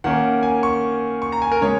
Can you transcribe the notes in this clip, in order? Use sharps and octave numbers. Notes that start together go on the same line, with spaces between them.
D#3 A#3 C#4 F#5
G#5
C#6
C#6
A#5
G#5
A#4
C#3 G#3 C#4 C#5